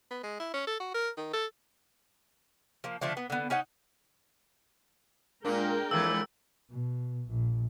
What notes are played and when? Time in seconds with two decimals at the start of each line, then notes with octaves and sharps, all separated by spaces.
0.11 B3
0.23 G#3
0.40 E4
0.54 C#4
0.67 A4
0.80 F#4
0.94 A#4
1.17 D#3
1.33 A4
2.84 F3 A#3
3.01 D3 F3 A3 D4
3.17 B3
3.30 D3 B3
3.50 C#4 D#4 C#5 F#5
5.45 A#2 G#3 A#3 D4 A#4 G5
5.91 F2 A2 E3 A3 A#3 D5 E6
6.70 B2
7.30 A#1